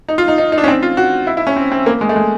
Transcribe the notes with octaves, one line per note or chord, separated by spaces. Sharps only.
D#4
F4
D#4
D#4
D#4
D4
C#4
C4
F4
F#4
E4
E4
C#4
C4
C4
A#3
G#3
A3
G#3